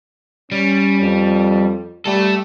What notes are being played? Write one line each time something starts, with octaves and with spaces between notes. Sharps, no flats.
G3 C#4
F2
G3 A3 A4